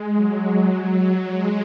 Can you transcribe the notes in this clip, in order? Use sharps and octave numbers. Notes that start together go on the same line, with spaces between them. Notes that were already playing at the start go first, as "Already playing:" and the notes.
Already playing: G#3
F#3
G#3